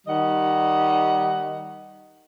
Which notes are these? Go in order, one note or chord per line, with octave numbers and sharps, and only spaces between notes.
D#3 G3 D#5 F#5